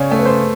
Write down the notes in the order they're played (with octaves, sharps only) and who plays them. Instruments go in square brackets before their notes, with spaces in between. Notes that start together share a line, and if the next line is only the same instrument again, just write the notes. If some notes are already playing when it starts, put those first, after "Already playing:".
Already playing: [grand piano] C#3 [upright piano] C#5 D5
[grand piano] A3
[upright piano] B4
C5